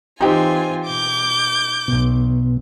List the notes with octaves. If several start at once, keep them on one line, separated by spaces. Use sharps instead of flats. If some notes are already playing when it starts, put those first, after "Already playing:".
E3 C4 D#4 F4 G4 G#5
B2 D6 G6
B1 B2